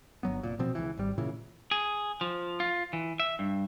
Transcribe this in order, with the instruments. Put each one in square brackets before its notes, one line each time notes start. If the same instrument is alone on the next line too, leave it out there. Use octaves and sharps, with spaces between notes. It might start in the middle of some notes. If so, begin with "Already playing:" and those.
[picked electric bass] G1 F#3 B3
F1 A#2
B2 F3 C4
C#2 E3
G#1 G3
A#2 C#3 E3
[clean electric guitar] G#4
F3
F4
E3
E5
G2